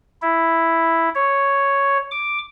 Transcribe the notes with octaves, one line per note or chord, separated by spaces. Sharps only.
E4
C#5
D6